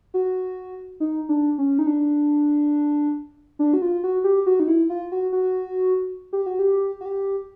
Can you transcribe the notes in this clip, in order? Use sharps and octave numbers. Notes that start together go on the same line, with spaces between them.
F#4
D#4
D4
C#4
D#4
D4
D4
F#4
F4
F#4
G4
F#4
D#4
E4
F4
F#4
F#4
G4
F#4
G4
F#4
G4